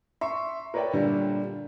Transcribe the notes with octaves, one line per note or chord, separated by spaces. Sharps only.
E5 C6 C#6
A#4 B4 C#5 D5 E5 G5
A#2 D3 G3